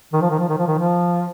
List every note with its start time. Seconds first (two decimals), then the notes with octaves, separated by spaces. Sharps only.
0.13 D#3
0.22 F3
0.30 D#3
0.39 F3
0.49 D#3
0.58 F3
0.67 D#3
0.79 F3